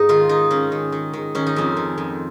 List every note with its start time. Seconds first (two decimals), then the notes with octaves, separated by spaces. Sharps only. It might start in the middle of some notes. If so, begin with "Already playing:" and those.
Already playing: G#2 D#4
0.09 D#3 F4
0.29 D#3 D#4
0.51 D#3 C#4
0.72 D#3
0.92 D#3
1.13 D#3
1.35 D#3 C#4
1.47 D#4
1.56 F2 C#4
1.77 D#3
1.98 F2